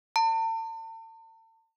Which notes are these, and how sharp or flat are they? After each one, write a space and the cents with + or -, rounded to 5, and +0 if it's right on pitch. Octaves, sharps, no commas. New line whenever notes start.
A5 +40